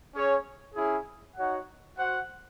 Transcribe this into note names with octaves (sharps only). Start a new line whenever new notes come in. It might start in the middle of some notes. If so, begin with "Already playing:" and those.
C#4 G#4 C#5
C#4 E4 G#4
D#4 F#4 C#5 F#5
F#4 C5 F#5